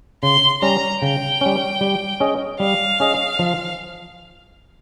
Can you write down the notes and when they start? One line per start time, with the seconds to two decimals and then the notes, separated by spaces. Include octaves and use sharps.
0.23 C#3 C6
0.62 G3 C#4 A#5
1.02 C#3 G5
1.41 G3 C#4
1.81 G3
2.20 C#4 G#4 D#5
2.60 G3 F5
3.00 C#4 G#4 D#5
3.39 F3